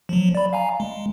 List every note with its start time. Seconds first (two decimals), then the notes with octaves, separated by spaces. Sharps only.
0.09 F3 F#3
0.35 D5 B5
0.53 F5 G#5 A#5
0.80 G#3